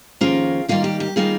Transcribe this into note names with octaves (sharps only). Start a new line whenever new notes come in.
F2 D#3 A#3 C#4 F4 G#4
D#3 G3 A#3 D#4 F4
G4
G4
D#3 G3 A#3 D#4 F4 G#4